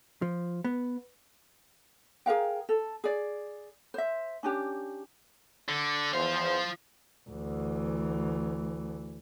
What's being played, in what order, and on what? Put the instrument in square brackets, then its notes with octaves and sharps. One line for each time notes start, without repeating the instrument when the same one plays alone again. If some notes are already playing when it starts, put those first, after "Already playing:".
[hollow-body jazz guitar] F3
B3
[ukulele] G#4 A#4 F5 G5
A4
G#4 D5
C5 E5
C#4 D4 G4
[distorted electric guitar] D3
[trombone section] E2 C5 [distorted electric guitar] F3 F5
[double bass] D2 E3